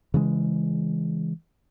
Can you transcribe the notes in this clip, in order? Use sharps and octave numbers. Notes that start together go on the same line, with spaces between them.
C#3 E3 G#3